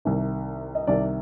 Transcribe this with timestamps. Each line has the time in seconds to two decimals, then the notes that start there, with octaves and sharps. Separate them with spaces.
0.05 C2 C3 D#3
0.75 D#5
0.87 C2 C3 D#3 D5